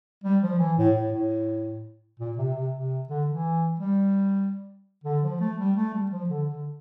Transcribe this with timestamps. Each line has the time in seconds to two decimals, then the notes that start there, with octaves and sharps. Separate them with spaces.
0.24 G3
0.42 F3
0.59 E3
0.77 A2
0.96 A2
1.12 A2
2.19 A#2
2.37 C3
2.55 C3
2.74 C3
3.09 D3
3.27 E3
3.80 G3
5.04 D3
5.23 F3
5.40 A3
5.59 G3
5.77 A3
5.93 G3
6.11 F3
6.29 D3
6.48 D3